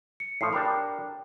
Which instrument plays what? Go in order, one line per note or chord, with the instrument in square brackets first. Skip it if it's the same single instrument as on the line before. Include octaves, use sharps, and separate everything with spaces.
[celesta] C#7
[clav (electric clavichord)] A2 F3 [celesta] C7
[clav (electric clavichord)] D4 G4 A#4 [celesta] G5 A#5 B5
[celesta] G5